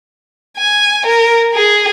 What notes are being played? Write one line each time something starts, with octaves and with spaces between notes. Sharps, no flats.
G#5
A#4
G#4